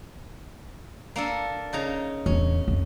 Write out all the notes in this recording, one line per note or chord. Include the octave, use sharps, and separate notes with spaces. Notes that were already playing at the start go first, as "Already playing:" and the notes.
A#3 D4 A4
C#3 D#4 A#5
D1 E2 C#4
F2